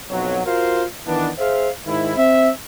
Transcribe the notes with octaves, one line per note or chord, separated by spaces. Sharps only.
B1 F2 F#3
F4 F#4 A#4 C5 F5
D#3 E3 B3 D4
G#4 C5 E5 F5
G#2 D#3 E4
C4 E5